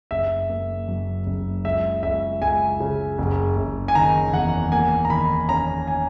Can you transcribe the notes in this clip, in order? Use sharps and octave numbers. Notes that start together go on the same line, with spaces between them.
F#1 E5
A#3
F#2
F#1
C#2 E5
C#2 E5
C#2 G#5
C#3
F#1
F#1
G#5
D#3 A#5
E2 F#5
A#3 G#5
A#5
D#3 B5
C#4 A#5
G#5